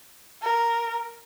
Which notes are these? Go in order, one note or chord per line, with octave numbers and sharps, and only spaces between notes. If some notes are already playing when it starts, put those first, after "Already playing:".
A#4